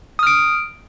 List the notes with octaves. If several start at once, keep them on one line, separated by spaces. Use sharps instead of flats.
D#6 F6 D7